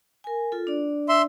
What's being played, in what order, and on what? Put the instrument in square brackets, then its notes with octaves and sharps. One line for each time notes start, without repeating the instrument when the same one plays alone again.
[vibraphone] A#4 G#5
F4 A4
D4 D5
[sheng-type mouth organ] E5 C6